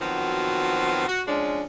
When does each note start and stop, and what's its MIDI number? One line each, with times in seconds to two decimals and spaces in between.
0.01 1.08 51
0.01 1.08 53
0.01 1.08 54
0.01 1.08 59
0.01 1.08 60
0.01 1.08 66
1.08 1.22 66
1.27 1.63 53
1.27 1.63 56
1.27 1.63 61
1.27 1.63 62